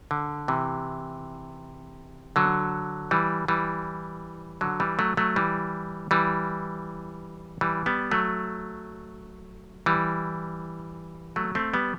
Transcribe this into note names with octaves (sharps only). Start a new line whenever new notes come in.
D3
C3 E3
D3 F#3
E3 G3
E3 G3
D3 F#3
E3 G3
F#3 A3
F#3 A3
E3 G3
E3 G3
E3 G3
G3 B3
F#3 A3
E3 G3
F#3 A3
A3 C4
G3 B3